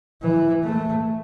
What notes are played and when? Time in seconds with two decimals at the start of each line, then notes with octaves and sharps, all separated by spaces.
0.22 E3
0.63 A3